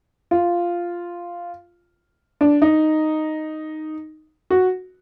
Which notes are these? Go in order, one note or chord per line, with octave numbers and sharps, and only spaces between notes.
F4
D4
D#4
F#4